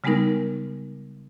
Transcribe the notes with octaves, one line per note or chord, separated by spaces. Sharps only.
C#3 G3 G#3 B3 D#4 A#4